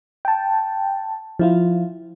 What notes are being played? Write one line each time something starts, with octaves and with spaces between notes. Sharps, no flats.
G5 A5
F3 E4 F4